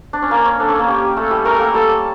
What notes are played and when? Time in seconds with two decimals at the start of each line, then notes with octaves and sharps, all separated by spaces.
0.13 D4
0.22 C#4
0.31 A#3 A#4
0.45 C#4
0.60 D4 A4
0.69 C#4
0.79 A#3
0.88 C#4 G4
1.17 A3 A4
1.31 G3
1.45 A3 A#4
1.59 A#3
1.73 G3 A4